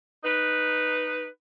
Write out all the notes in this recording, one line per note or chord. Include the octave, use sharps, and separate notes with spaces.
D#4 B4